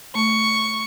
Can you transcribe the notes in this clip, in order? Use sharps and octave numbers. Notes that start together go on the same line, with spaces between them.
A3 C#6